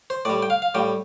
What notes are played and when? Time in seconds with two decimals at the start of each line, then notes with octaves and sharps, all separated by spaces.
0.10 C5
0.25 A2 G3 D5
0.43 G5
0.50 F5
0.62 F5
0.74 A2 G3 G5